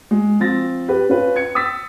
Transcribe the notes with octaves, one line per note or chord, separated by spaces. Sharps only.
G#3
F3 C4 A6 A#6
G4 B4
C#4 F4 B4
G#6 C#7
D#6 E6 A6 B6